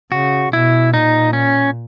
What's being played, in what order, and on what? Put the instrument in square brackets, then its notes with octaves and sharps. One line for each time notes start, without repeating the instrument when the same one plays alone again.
[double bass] C#3 [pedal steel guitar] F#4
[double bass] B2 [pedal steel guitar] E4
[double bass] A#2 [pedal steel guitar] D#4
[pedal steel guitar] C#4